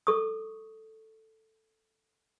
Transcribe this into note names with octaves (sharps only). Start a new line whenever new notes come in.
A4 C#6 D#6